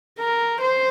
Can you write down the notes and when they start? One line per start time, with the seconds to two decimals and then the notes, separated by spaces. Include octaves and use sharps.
0.19 A#4
0.60 C5